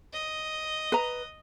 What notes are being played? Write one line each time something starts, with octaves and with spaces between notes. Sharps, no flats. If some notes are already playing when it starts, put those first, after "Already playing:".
D#5
B4 A#5